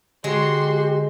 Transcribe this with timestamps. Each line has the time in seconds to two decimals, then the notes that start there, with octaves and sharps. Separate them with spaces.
0.24 D3 G#3 F#4 G4 C6